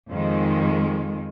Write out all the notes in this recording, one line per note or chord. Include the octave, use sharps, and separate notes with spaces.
F2 D#3 G#3